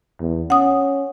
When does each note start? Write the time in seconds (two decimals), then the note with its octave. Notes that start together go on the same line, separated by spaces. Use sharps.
0.20 E2
0.50 C#4 F#5 D#6